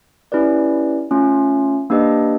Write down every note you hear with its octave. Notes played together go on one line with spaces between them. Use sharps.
C#4 E4 G4 B4 D5
A3 C#4 F4
A#3 D4 G4 B4 D#5